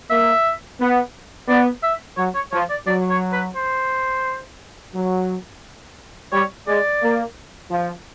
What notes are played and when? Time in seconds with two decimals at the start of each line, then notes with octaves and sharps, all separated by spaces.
0.10 A#3 E5
0.80 B3
1.48 B3 D5
1.83 E5
2.17 F#3 C#5
2.35 C#5
2.52 F3 C#5
2.70 D5
2.87 F#3 D5
3.10 C#5
3.33 B4
3.56 C5
4.94 F#3
6.32 G3 C#5
6.68 G#3 D5
7.02 A#3
7.70 F3